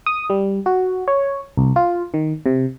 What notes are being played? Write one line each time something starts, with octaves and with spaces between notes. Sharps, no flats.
D#6
G3
F#4
C#5
C2
F4
D#3
C3